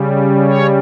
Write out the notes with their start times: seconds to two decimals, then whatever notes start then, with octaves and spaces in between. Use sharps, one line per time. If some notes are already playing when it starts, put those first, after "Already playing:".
Already playing: C#3 G3
0.44 C#5